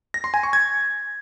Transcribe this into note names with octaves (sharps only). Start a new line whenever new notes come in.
A#6
C6
G#5
C#6
G#6